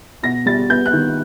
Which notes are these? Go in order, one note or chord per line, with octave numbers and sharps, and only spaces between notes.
B2 A#6
G3 A6
B3 G6
F#6
D#3